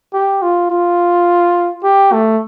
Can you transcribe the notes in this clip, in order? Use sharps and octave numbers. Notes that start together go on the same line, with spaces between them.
G4
F4
F4
G4
A3